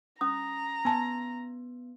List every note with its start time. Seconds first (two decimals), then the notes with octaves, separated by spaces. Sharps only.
0.21 C#4 A#5 D#6
0.85 B3 G#5 A5